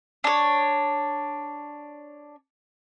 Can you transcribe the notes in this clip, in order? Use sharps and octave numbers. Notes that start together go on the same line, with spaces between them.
D4 C#5